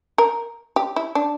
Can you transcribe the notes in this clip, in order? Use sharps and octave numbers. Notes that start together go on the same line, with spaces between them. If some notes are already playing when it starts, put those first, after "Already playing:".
A#4
G4
E4
D4